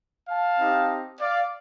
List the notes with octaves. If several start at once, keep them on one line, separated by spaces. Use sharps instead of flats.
F5 A5
C4 D#4 G4
D5 F5